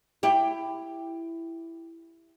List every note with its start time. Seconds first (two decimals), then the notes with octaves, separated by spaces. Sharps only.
0.23 E4 G4